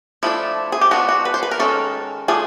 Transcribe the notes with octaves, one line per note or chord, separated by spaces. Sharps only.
F3 A3 D4 E4
G#4
G4
F3 G#3 B3 D4 F#4
F#4
B4
C5
B4
A#4
D#3 G#3 C#4 A4
F3 A3 D4 G#4